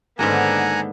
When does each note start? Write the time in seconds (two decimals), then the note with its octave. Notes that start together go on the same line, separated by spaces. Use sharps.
0.19 G#2 D3 D#3 A#3 B3 F#5 G#5 A#5